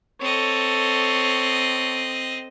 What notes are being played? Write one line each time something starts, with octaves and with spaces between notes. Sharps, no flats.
C4 A4 C#5 D#5